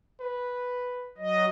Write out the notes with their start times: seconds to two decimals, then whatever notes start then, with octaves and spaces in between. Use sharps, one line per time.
0.20 B4
1.18 F#3 D#5